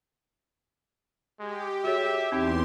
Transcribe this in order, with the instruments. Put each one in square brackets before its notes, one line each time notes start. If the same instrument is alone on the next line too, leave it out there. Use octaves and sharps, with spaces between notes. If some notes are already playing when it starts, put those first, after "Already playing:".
[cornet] G#3 [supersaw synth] G4
[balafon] F#4 G#4 C#5 [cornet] E5
[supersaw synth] E2 C6 [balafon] C4 D#4 [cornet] G4